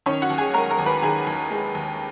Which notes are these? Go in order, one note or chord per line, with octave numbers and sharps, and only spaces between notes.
D#3 C#4 C#5
F#4 F#5
D#2
G#4 G#5
G#3 A#4 A#5
A#4 A#5
D#2
B4 B5
D#3 G#4 G#5
D#2
G#3
D#2